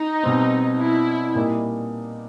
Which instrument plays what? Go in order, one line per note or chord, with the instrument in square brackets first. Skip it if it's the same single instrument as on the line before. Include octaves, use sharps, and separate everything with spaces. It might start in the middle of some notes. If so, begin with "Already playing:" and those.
Already playing: [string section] D#4
[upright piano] B2 G3 C4
[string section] E4
[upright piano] A#2 G3 A#3 D#4